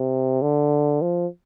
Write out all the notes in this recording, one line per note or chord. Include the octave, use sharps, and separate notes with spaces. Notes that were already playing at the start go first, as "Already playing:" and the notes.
Already playing: C3
D3
F3